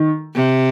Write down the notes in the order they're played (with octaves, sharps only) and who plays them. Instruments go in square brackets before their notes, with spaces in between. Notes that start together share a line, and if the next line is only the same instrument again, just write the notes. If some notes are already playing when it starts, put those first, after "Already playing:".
Already playing: [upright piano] D#3
[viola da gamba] C3